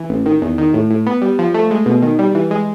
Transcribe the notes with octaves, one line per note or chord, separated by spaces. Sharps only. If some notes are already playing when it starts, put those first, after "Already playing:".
Already playing: E3
A1
D#3
E2
D#3
A2
A2
B3
G3
F3
A3
G#3
B2
D#3
G3
E3
G#3